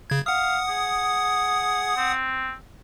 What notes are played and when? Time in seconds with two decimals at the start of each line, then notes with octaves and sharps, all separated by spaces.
0.10 C#3 G#6
0.26 F5 F#5 D#6
0.69 G#4
1.96 C4